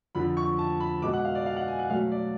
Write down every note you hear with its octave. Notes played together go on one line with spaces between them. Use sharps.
F2 D3 F3 B5
C#6
A5
B5
B2 G#3 B3 D6
F#5
F5
D5
F5
F#5
G#5
F#5
B2 F#3 A3 F5
D5